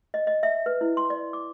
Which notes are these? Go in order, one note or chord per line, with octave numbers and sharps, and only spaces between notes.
D#5
D#5
E5
B4
E4
C6
D5
D6